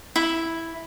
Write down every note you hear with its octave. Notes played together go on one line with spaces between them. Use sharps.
E4